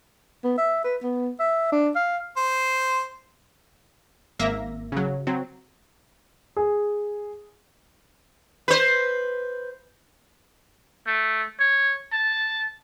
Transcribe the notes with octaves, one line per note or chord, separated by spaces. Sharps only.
B3
E5
B4
B3
E5
D4
F5
C5
G#1 A#3 E5 A#6
C#3 F#3
F#3 C4
G#4
B4 C5
A3
C#5
A5